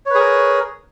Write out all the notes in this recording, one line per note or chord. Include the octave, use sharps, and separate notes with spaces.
G#4 A#4 B4 C#5